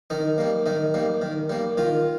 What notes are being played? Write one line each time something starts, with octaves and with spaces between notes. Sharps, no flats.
D#3 D#4
G3 A#3
D#3 D#4
G3 A#3
D#3
G3 A#3
D#3 F4